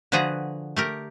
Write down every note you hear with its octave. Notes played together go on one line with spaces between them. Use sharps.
D3 F3 F#4 G#4 B4 A#5
A3 G4 A#4